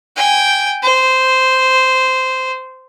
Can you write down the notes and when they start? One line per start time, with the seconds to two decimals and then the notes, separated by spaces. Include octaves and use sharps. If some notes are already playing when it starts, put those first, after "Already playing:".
0.16 G5 G#5
0.83 C5